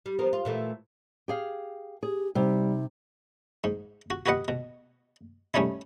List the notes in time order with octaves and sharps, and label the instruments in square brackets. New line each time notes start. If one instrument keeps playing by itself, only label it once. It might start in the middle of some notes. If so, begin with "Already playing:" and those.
[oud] G3
F3 B3 A#4
F4
A#2 E3 A3
[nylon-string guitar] G4 G#4 F5
[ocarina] G4 [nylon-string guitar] G#4
[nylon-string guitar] C3 [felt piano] G3 [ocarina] D#4
[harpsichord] G#2
F#4
F#4 G4 B4 D#5 F#5
B2
G3 A3 C#4 D#4 E4